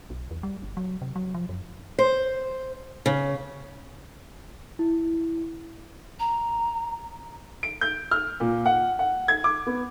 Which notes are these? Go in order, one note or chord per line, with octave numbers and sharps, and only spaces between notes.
B1
E2
G3
G1
F#3
C3
F#3
F3
F#2
C5
C#3
E4
A#5
D7
G6
F6
A#2
F#5
F#5
G#6
D6
B3